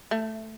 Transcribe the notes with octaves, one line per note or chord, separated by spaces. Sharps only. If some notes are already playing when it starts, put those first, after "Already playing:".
A3